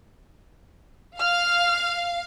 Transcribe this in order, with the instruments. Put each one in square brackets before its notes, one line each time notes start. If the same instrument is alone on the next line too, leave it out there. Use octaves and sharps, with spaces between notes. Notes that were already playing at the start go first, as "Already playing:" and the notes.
[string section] F5 [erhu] F6